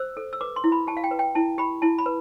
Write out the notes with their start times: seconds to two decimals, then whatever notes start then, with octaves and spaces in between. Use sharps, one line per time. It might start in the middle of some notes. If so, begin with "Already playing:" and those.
Already playing: C5 E6
0.17 A4
0.33 E6
0.41 B4 D6
0.56 C6
0.64 E4
0.72 B5
0.87 G4 A5
0.97 F5
1.04 G5
1.11 B4
1.19 G5
1.35 E4 A5
1.58 G4 B5
1.82 E4 A5
1.98 B5
2.06 B4